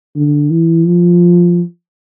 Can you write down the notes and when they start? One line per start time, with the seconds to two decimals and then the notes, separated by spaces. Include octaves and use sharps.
0.16 D3
0.51 E3
0.87 F3